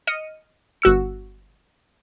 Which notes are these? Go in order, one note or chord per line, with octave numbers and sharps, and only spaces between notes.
D#5 F6 C#7 D#7
G1 F#4 E6 C#7